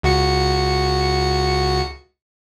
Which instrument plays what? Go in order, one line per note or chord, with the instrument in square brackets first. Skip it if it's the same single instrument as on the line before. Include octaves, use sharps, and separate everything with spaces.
[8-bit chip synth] C#2 F#4 C#7